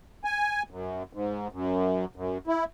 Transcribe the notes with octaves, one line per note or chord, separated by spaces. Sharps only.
G#5
F#2
G#2
F#2
F#2
E4